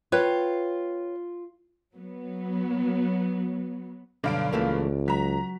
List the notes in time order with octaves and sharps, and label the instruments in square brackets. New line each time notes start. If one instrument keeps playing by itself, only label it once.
[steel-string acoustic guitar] F4 [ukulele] B4 C#5 G5
[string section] F#3 B3
[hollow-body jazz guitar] B1 D3 D5 [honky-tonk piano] G2 F5 D7
[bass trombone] C#2 [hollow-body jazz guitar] E3 A3 A#3
[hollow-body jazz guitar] F#3 [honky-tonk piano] A#5 B6